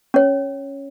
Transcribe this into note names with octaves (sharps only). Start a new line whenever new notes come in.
C#4 C#5